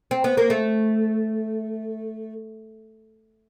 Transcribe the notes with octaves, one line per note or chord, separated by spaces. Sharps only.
C4
B3
A#3
A3